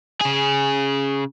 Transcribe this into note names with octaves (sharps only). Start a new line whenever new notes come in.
C#3 G#4